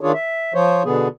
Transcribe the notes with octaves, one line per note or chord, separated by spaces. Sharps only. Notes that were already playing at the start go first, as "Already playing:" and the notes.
D#3 D4 F4 G#4 C#5
E5
F3 C5 C#5
B2 D3 B3 G#4